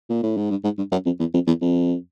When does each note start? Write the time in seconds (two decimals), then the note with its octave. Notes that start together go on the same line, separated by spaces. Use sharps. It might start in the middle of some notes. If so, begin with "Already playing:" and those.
0.10 A#2
0.23 A2
0.37 G#2
0.50 G2
0.64 G#2
0.78 G2
0.92 F#2
1.06 F2
1.20 E2
1.34 F2
1.47 E2
1.61 F2